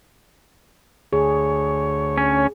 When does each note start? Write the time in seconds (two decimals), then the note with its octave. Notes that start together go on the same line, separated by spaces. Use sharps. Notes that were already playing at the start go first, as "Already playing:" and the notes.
1.13 D2 G#4 C#5
2.18 C#4